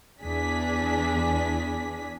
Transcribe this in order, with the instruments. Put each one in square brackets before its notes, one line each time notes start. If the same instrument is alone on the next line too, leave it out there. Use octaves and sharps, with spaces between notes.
[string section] E2 D4 G#4 B6